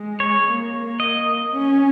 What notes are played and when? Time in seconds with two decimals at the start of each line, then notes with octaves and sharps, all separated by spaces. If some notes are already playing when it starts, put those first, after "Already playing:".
Already playing: G#3
0.20 C#5
0.47 A#3
1.00 D#5
1.51 C#4